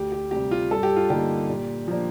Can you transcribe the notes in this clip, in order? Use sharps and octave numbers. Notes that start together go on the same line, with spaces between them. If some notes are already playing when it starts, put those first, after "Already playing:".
Already playing: D2 G4
G4
C3 G3 G4
F4
G2 A4
G4
F4
D3 G3 A#3 D#4 G4
A#2
F3 A#3 D4